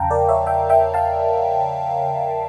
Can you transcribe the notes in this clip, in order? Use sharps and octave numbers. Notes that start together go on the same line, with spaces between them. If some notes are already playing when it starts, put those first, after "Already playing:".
Already playing: E2 C#3 F3 F5 G5 A5 A#5
A#4 D5
C#5 E5
E5 G5
E5 G5
F5 A5